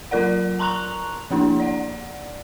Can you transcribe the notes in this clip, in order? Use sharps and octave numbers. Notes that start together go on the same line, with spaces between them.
F#3 F4 A#4 D5 F#5
A5 A#5 C6 C#6 F#6 F7
F3 A#3 D4 E4
D5 F#5